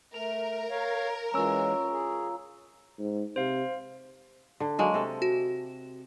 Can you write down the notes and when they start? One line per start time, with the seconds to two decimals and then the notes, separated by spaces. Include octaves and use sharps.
0.14 A3 A#4 F7
0.70 C#5 F5
1.34 E3 G#3 C#4 F4 A#5 E6
1.91 G#4
2.98 G#2
3.36 C3 C5 F5
4.60 D3
4.79 F#3 G#3 A#3
4.94 C3 A4
5.22 F#4